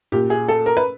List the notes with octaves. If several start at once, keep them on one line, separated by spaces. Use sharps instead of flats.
A#2 G4
G#4
A4
A#4
B4